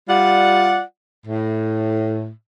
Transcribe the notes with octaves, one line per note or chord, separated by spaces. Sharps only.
G3 F4 D5 F#5
A2